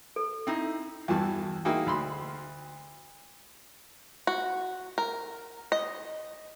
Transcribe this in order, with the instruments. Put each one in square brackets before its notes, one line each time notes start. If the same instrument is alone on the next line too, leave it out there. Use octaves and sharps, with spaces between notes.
[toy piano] A4
[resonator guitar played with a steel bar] C4 D#4 E4
[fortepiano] E2 G2 E3 F#4 A5
A#3 D#4 E4 F#4 G#4 G5
D2 B5 C6
[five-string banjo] F#4
A#4
D#5